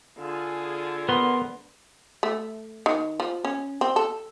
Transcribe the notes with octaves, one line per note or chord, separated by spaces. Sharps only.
D3 F4 G#4
B3 A#4 C6
A3
D#3
F3
C#4
C4
A4